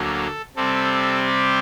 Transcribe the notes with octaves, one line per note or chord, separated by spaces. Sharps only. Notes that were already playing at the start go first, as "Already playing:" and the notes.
Already playing: D2 D3 F#3 A#3 A4
C3 G3 C4 A4
G4